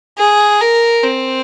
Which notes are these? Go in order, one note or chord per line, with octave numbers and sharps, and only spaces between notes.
G#4
A#4
C4